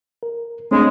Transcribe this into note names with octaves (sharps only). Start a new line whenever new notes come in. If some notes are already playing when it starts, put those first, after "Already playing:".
A#4
C#3 G#3 A3 C4 D4